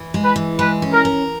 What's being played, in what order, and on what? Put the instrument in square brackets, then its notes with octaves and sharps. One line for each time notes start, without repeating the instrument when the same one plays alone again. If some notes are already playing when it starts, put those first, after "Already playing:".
Already playing: [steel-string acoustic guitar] E3
G#3
[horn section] B4
[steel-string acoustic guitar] E3
[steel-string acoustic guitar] G#3 [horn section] B4
[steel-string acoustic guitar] C#4
[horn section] A#4
[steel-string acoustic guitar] A#4